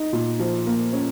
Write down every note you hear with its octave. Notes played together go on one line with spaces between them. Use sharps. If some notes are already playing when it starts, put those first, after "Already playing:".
Already playing: D#4
A#2
F3
A#3
C#4